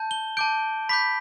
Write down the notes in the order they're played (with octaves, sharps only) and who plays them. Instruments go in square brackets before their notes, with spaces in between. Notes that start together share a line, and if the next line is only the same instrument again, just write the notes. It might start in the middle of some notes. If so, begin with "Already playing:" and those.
Already playing: [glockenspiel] A5 G6
G7
A5 D6 G6 D7
B5 D6 G6 B6